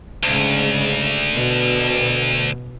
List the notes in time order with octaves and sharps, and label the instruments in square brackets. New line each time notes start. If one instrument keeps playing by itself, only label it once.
[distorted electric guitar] D2 [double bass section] G#2 C#3
[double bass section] B2